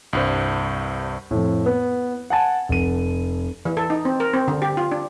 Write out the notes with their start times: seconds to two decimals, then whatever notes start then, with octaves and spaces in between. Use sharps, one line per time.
0.13 C2 G2 C5
1.31 F2 A2
1.66 B3
2.30 F#5 G#5 A5
2.69 F1 D#7
3.65 E3
3.77 A4
3.90 D#4
4.05 C4
4.20 A#4
4.33 C4
4.48 D3
4.62 G4
4.77 F4
4.92 D4